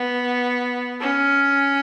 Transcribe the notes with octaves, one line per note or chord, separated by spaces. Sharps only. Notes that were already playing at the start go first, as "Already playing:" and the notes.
Already playing: B3
C#4